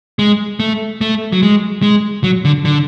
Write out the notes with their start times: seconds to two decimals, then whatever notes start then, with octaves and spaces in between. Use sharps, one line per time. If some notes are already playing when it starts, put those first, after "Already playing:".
0.19 G#3
0.60 A3
1.01 A3
1.32 F#3
1.43 G#3
1.82 G#3
2.24 F#3
2.45 D3
2.65 D3